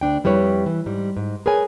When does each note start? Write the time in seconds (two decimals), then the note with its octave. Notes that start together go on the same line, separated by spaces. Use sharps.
0.01 D2 D4 G5
0.24 F2 G3 E4 B4 C#5
0.66 E3
0.86 G#2 G3
1.17 G#2
1.46 G#4 A#4 B4 C#5 G#5